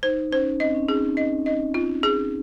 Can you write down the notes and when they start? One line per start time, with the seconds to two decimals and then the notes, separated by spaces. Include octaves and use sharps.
0.03 D#4 C5
0.31 C#4 C5
0.60 C4 D#5
0.75 C#4
0.88 D#4 G#4
1.03 D#4
1.17 D#5
1.46 D#5
1.74 F4
2.03 G#4